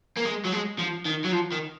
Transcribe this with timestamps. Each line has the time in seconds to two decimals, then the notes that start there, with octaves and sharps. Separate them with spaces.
0.17 A#3
0.25 G#3
0.45 F#3
0.53 G#3
0.79 F3
1.06 D#3
1.25 F#3
1.33 F3
1.52 D#3